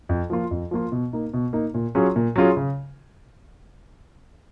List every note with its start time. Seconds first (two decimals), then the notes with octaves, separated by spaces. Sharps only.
0.09 F2
0.30 F3 A#3 F4
0.51 F2
0.71 F3 A#3 F4
0.92 B2
1.13 A#3 D#4
1.34 B2
1.53 A#3 D#4
1.74 A#2
1.95 F#3 C#4 F4 G#4
2.16 A#2
2.36 F#3 C#4 F4 G#4
2.57 C#3